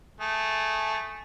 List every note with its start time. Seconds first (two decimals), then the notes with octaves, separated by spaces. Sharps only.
0.21 A3 G#4